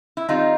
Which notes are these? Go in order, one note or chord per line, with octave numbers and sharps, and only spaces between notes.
E4
D#3 G3 C4 D#4 F4